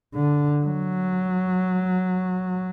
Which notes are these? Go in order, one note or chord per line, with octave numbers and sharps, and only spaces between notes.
D3
F#3